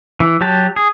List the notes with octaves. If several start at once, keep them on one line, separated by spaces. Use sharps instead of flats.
E3
F#3 G4 A5
G#4